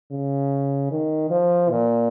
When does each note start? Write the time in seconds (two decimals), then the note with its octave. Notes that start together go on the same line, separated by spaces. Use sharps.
0.11 C#3
0.91 D#3
1.31 F3
1.70 A#2